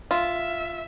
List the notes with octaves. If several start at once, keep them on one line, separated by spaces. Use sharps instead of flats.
F4 E5